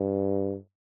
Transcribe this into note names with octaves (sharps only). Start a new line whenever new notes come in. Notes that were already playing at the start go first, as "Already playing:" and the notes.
Already playing: G2